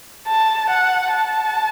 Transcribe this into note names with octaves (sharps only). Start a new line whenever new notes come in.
A5
F#5
A5